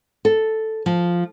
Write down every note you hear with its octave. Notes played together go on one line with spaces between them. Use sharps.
A4
F3